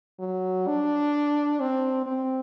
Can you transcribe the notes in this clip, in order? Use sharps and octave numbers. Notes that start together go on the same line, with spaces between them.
F#3
D4
C4
C4